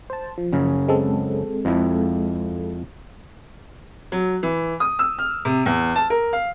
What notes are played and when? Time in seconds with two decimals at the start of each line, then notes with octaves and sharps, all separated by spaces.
0.10 C5 A5
0.38 F3
0.53 F#2 C#3
0.88 G#3 C4 A4
1.65 F2 E4
4.12 F#3
4.43 E3
4.80 D#6
4.99 E6
5.19 F6
5.45 C3
5.66 E2
5.96 A5
6.10 A#4
6.33 F5